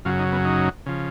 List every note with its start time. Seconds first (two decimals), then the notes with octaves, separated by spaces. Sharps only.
0.05 F#2 C#3 F#3 F4
0.19 D#4
0.32 B3
0.45 D#4
0.86 C#3 F3